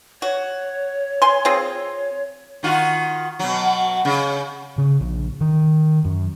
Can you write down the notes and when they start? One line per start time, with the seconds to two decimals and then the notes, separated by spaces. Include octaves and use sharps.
0.22 F#4 C#5
1.22 G#5 C6
1.45 C4 F4 G#4
2.63 D#3 F4 F#4
3.39 B2 F#3
4.05 C#3
4.78 C#3
5.01 A#1
5.41 D#3
6.05 F#2